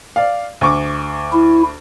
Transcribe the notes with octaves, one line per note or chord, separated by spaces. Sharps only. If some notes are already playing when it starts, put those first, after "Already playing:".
D5 F5
D2 C#6 D6
E4